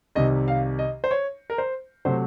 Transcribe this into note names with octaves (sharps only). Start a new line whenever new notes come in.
C2 C3 D#3 D#5
F5
D#5
C5
C#5
A#4
C5
C3 F#3 A3 C5